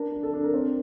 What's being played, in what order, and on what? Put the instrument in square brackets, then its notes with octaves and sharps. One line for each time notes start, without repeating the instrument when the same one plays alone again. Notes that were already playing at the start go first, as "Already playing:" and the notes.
Already playing: [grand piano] D4 A#4
D4
A4
D4
A#4
C4 C5